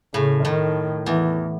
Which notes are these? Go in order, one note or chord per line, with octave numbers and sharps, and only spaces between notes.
A2 C#3
A2 D#3
E2 E3